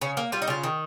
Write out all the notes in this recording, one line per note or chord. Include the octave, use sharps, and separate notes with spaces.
C#3 C#4
A#3
G3 F4
D#4
C#3 F4
D#3